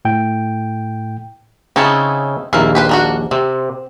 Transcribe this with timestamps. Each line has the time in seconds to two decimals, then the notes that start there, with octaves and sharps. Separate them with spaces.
0.05 A2 G5
1.76 C#3 C4 D#4 E4 C#5 A5
2.53 A#1 D#2 A#3 E4 F5
2.75 G4 B4 C5
2.89 A#3 D4 F#4
3.31 C3 C4